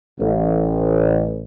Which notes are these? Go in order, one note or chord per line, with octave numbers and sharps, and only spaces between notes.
A1